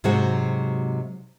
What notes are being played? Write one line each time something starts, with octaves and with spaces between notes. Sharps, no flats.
G#2 C3 F#3 G#3 C4 F#4